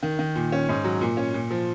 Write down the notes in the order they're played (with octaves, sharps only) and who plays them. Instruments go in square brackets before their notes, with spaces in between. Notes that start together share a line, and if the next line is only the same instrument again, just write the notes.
[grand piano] D#3
D#3
A#2
C#4
G#2
F#3
A#2
C#4
A#2
F3